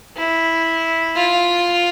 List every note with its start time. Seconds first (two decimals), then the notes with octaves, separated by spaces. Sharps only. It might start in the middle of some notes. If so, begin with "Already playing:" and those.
0.17 E4
1.16 F4